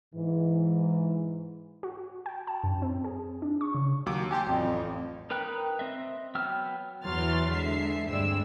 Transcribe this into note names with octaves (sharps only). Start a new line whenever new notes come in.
G#2 E3
F#4
G5
A5
F#2
C4
G#4
D4
C#6
C#3
D#2 F#3 D6
G4 G#5 A5 C6
A1 F2
D#4 A#4 B4 G5 F#6
C4 D#5 E5
F#3 B3 G5 E6 F6
E2 E3 F#3 C6 F6 A6
D3 G#3 E5 C7
D2 G2 G#3 C4 D5 E6